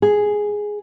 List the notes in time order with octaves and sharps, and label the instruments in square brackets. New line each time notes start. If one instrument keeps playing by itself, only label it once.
[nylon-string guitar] G#4